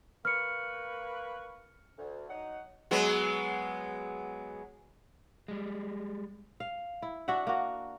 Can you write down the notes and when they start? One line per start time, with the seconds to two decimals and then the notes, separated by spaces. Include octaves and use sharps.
0.25 A#3 B4 C#6 F6 C#7
1.98 D2
2.29 F#3 D#4 F#5
2.91 F#3 G#3 B3
5.48 G3 G#3
6.60 F5
7.02 E4
7.28 D4 F#4 E5 F#5
7.47 A#3 F#4